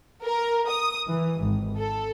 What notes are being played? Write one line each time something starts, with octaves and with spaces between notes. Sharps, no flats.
A#4
D#6
E3
G#1
A4